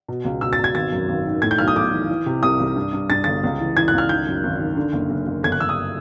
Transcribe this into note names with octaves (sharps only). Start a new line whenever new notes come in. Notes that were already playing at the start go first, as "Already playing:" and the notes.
B2
C#2
B2 E6
A6
B2 G#6
G#1 A6
F#2
G#1
D#3
A2 G#6
G6
B1 F6
D#6
B1 D6
E3
E3
C3
C2 D#6
C2
G2
G2
G2 A6
G1 A6
C#2
E3
E3 G#6
F#6
C#2 F6
D#3 G6
F#2
G#1
D#3
D3
F#1
F#1
F#1
G1 G#6
F#6
G1 E6
D#6